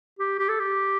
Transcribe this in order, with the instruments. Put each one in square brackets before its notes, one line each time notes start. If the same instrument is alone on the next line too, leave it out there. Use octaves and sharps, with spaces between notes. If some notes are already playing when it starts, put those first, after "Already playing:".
[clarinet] G4
G4
A4
G4